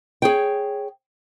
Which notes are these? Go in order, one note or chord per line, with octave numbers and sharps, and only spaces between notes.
G#4 C#5 G5